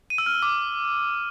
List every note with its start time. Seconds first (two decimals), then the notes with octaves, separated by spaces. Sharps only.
0.10 D#7
0.18 E6
0.26 F6
0.34 E6
0.42 D6